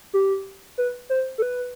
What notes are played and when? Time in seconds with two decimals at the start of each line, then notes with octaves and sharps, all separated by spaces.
0.13 G4
0.78 B4
1.10 C5
1.38 A4
1.42 B4